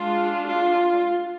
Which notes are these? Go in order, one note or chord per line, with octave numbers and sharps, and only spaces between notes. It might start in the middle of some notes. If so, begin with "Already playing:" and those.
Already playing: G#3 D4 F4
F4